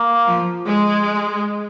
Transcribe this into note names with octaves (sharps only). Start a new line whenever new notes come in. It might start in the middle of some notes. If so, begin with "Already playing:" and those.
Already playing: A#3
F3
G#3